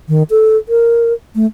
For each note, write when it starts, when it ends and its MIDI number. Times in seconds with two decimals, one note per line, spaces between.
0.09 0.23 51
0.30 0.57 69
0.69 1.13 70
1.35 1.46 57